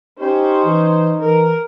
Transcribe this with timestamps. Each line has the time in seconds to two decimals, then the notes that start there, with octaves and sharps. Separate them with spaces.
0.20 C#4 D#4 G4 C5
0.65 E3
1.20 E3 A#4